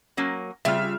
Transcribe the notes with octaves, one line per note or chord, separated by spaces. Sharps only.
F#3 A#3 C#4
C#3 G3 C4 F4 E5 F6